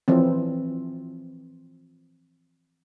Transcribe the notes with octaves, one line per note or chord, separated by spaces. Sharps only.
E3 F3 C4